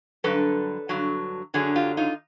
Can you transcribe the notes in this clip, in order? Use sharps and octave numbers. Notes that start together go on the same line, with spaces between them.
G2 D3 F#3 A4 B4
G2 D3 F#3
F#2 D3 F#3 G#4
F4 G4
D#4 F4